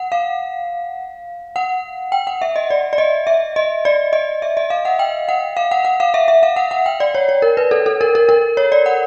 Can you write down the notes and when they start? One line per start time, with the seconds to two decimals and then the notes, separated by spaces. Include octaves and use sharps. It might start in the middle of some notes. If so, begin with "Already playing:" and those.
Already playing: F#5
0.12 F5
1.56 F#5
2.12 G5
2.27 F#5
2.42 E5
2.56 D#5
2.70 D5
2.93 D5
2.98 D#5
3.27 E5
3.56 D#5
3.85 D5
4.13 D#5
4.42 E5
4.57 D#5
4.70 F5
4.85 F#5
4.99 G5
5.29 F#5
5.57 F5
5.71 F#5
5.85 F#5
6.00 F5
6.14 E5
6.28 E5
6.43 F5
6.56 F#5
6.71 F#5
6.86 G5
7.00 D5
7.15 C#5
7.29 C#5
7.42 A#4
7.57 B4
7.71 A4
7.86 A4
8.01 A#4
8.15 A#4
8.29 A#4
8.57 C#5
8.72 D5
8.86 F#5